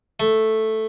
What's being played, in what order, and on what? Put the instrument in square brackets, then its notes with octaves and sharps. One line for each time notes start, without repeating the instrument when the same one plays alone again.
[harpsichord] A3